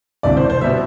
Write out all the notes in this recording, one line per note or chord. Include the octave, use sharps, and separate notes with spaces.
E1 D2 C3 E3 D5
C5
C5
B2 G3 B3 E5